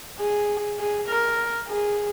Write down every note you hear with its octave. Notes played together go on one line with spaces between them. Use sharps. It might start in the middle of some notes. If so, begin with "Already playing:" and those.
G#4
G#4
A#4
G#4